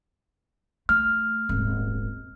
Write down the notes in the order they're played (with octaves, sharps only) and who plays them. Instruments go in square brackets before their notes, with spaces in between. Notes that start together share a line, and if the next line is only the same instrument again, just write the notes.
[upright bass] A3 [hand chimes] F6
[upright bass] D#1 G#1